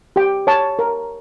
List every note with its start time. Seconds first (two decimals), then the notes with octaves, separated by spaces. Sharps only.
0.16 G4 G5
0.47 C#5 A5
0.79 A#4